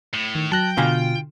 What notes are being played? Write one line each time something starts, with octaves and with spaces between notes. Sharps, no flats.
A2
D#3
F#3 G5 A5 F#6 A#6
B2 D3 F4 F5 G#5